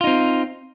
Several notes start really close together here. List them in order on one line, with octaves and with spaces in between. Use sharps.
F4 D#4 C4